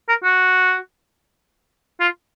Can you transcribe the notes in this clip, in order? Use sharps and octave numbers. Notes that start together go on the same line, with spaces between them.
A#4
F#4
F4